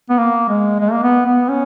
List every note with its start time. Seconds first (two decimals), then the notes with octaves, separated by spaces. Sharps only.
0.10 B3
0.18 A#3
0.49 G#3
0.80 G#3
0.92 A#3
1.03 B3
1.26 B3
1.49 C#4